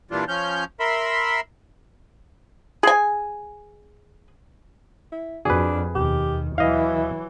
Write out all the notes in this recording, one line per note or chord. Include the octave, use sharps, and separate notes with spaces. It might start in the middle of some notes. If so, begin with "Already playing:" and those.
A#2 E3 G3 D4 F4
F3 C#4 F6 G6
A#4 E5 B5 C6
G#4 G#5
E4
F2 D4 F#4 G#4 B4
D#2 B2 D#3 G4
E3 F#3 E4 D#5 F5